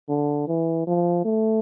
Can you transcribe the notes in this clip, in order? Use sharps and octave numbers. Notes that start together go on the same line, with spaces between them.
D3
E3
F3
A3